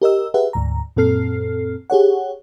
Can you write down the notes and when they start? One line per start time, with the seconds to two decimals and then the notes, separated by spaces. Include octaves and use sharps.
0.02 G4 A#4 D#5 E6
0.34 G4 G#4 B4 E5 F#5
0.53 D2 G#2 A#5
0.97 F#2 A#2 C4 A4 F6 C7
1.90 G4 G#4 C#5 F#5